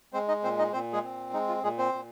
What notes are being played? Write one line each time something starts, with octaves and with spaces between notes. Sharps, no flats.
G#3 C4 C5
D#4 D#5
A#2 C4 C5
D#4 D#5
A#2 C4 C5
G#3 G#4
C4
G#3 D#4
F4
A#2 G#3 G#4
C4 C5
A#2